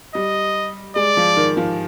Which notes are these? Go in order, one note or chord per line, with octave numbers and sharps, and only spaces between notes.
G3 D#5
G#3 D5
F3
D#3
F3